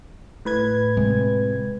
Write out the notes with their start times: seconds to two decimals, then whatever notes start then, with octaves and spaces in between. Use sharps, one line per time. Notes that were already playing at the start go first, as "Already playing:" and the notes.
0.45 A2 B4 G#6
0.97 C3 G#3